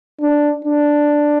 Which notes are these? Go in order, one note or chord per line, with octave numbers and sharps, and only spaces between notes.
D4
D4